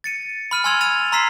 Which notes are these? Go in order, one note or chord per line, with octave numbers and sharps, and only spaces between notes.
A6 C#7 D#7
B5 F6 D#7
G#5 B5 C6 E6 G#6 F7
E6 G#6 A6 D#7 F7
A#5 C6 E6 B6 C7 E7